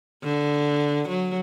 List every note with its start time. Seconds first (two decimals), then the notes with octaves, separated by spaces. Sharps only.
0.24 D3
1.09 F#3